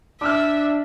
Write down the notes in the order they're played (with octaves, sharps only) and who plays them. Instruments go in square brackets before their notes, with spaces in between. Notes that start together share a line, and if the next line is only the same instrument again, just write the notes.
[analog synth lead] D4 [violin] E5 [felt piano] D6 E6 F6